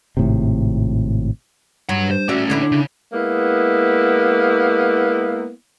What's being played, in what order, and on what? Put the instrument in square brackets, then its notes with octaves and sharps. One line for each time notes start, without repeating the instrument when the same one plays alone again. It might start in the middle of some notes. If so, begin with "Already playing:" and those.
[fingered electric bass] G#1 A2 C3
[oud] G2 [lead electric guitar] C#5 F#5
[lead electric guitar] C5
[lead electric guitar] A2 C#4 [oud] F#4 D5 E5
[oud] D3 D4 E4
[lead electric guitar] C#3
[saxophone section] G#3 A#3 B3 E4